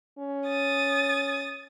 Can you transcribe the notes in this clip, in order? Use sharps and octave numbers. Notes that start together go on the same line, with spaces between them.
C#4
D#6 A6